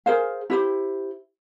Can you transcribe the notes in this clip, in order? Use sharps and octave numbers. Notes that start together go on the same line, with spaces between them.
G#4 A#4 C5 F5
E4 G4 C5